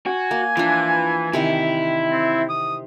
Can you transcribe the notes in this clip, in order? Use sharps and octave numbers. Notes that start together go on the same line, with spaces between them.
F#4 G#5
A#3
E3 F3 D4
C3 D#3 E3 E4
C4
D#6